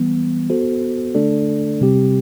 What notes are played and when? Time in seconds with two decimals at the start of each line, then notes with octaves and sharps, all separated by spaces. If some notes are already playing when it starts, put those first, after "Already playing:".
Already playing: E3 G3 B3
0.50 B3 F#4 A4 C5
1.15 D3 A3 D4 A4 D5
1.81 C3 G3 C4 G4